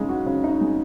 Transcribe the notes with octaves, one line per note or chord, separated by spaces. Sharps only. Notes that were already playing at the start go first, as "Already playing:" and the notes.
Already playing: C#3 G#3 D#4
F#4
C#3
D#4
G#3